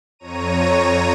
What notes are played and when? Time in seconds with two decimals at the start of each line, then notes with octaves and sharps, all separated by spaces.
0.19 F2 C#5 A#5 D#7